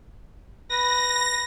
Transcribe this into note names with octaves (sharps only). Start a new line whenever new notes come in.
B4 A#6